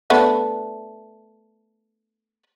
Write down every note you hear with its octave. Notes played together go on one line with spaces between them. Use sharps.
A3 B3 D4